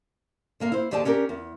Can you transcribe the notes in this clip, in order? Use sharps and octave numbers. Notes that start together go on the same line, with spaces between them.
D3 A#3 F5
E4 C5
D#2 D3 G4 G#4 D5 A5
C#4 D4 G4 A#4
E2